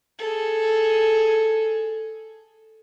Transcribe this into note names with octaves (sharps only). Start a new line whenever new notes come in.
G#4 A4